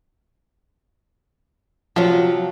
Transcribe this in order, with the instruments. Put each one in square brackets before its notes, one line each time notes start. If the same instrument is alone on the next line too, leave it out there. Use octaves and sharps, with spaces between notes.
[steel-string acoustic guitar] C3 F#3 [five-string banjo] F3 F4